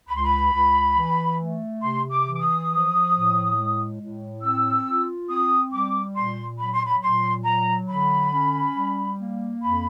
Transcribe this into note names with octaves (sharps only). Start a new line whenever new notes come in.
C#2 B5
C6
B5
C#2
E3
A3
C3 C6
D6
E3
D6
D#6
F3
A2
G#3
A2
C4 E6
F4
C4 D#6
G3 D6
A#2 C6
F#3 B5
C6
B5
A#2 C6
F#3 A#5
D3 B5
C#4
G3
A#3
F2 B5